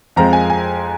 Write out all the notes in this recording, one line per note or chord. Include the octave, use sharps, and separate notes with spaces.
F2 F3 G#3 C4 A#5
G#5
G#5